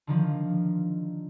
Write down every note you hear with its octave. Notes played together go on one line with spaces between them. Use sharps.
D3 D#3 F3